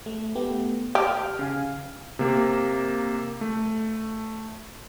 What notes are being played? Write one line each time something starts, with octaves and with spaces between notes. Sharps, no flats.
A3
A3 B3 G4
G4 F6
C#3 F5 G#5
C3 A#3
A3